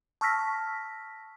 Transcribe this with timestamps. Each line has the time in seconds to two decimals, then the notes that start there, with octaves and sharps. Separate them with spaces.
0.21 A5 C#6 E6 F6 A#6 B6